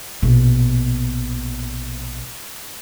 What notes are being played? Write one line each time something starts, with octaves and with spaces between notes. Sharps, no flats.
A#1 B2